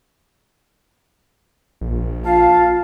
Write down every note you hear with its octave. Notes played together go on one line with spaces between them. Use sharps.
A#1
F4 F5 A5